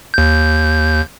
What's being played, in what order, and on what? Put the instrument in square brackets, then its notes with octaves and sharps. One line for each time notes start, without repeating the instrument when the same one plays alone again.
[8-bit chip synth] D#2 G6